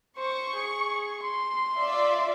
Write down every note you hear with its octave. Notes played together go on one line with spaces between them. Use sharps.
C5 C#6
G#4
C6
F4 D5 E5